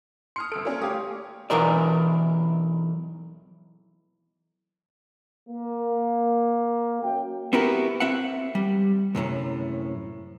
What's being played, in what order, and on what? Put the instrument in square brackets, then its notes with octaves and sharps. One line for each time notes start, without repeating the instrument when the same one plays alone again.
[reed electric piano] C6 [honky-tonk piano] D#6 F6 C#7
[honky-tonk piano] G1 E6 D7 [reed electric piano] A4
[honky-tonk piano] A#3 C#4
[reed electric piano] A3 G4 [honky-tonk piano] C#5 F5 D#6
[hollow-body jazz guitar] B1 E2 E3 A#4 D5
[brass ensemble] A#3
F#2 G5
[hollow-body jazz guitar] B3 C4 E4 F#4 G4 A#4
C4 E5 F#5
G3
C#2 F#2 A2 C3